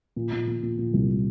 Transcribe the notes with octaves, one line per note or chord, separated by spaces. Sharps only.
A#2
A#2
A#2
A#2
A#2
C2